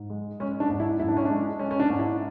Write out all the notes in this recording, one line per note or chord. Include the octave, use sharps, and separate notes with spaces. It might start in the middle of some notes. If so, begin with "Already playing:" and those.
Already playing: G#2
G#3
G#3 C#4
D4
G#2
E4
G#2 E4
D4
C#4
G#3 D4
G#3 C#4
C#4
D4
G#2
E4